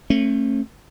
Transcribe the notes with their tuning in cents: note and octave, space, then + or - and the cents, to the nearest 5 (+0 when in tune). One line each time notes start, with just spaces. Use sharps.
A3 +20 C#4 -40